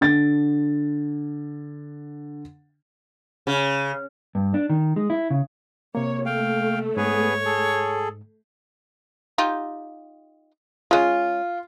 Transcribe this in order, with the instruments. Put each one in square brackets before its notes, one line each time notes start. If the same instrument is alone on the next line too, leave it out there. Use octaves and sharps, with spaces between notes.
[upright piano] D3 A6
[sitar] C#3
[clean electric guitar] G2
D4
D#3
G#3
E4
C#3
[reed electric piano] C3 A#3 [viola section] C#5
[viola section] A3 [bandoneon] F5 G5
[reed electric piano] G#2 [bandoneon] B3 G#4 B4 [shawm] C#5
[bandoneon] G#4 A4
[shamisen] D#4 F4 G4
[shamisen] G#3 C#4 [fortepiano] F4